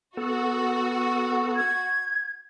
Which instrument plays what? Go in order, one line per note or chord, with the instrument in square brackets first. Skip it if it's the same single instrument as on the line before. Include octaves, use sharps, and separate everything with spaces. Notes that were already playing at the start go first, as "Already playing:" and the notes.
[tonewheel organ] B3 A4 [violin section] F#4
[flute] G#6